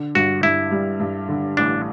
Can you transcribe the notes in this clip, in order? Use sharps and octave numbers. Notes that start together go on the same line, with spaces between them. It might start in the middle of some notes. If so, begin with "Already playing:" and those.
Already playing: D3
G2 F#4
G2 E4
G3
G2
D3
A1 D4